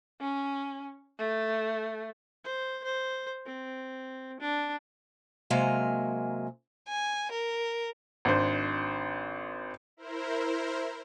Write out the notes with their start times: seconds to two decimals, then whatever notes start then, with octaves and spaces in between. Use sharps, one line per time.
0.21 C#4
1.19 A3
2.44 C5
2.84 C5
3.46 C4
4.40 D4
5.50 C3 F#3 G#3 A#3 G#5 A#5
6.89 G#5
7.31 A#4
8.25 G#1 D4 C5
9.97 E4 A#4 C5